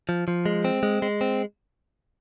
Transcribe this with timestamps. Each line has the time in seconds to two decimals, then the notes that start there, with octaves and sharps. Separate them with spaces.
0.09 F3
0.28 F3
0.46 G#3
0.65 C4
0.83 G#3
1.02 G#3
1.21 C4